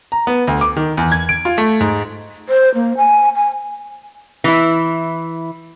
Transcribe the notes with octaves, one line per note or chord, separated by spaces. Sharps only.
A#5
B3
D2
D6
D#3
E2
G#6
D7
F4
A3
G#2
C5
A#3
G#5
G#5
E3 E4